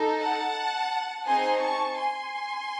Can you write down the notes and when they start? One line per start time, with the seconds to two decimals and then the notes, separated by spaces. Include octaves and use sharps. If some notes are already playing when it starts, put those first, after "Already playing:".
Already playing: D#4 A4
0.20 F#5 A5
1.26 C4 D#4 G#4 G#5 C6
1.61 A5 C#6
1.96 G#5 C6